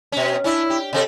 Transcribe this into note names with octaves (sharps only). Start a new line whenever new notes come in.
B2 C#4
C#4 D4 E4
G4
C3 C4 A4 D#5